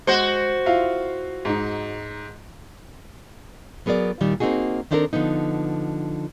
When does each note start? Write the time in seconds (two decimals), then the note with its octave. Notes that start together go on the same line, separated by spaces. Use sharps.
0.07 G#3 F#4 C5 F#5
0.66 E4 F4 F5
1.45 G#2 D#4
3.86 F#3 B3 G#4 A#4 D5
4.21 A#2 D#3 G3
4.40 A#3 C4 D4 D#4 F#4 G#4
4.91 D#3 C4 D4 E4 A4 A#4
5.13 D3 F3 B3 D#4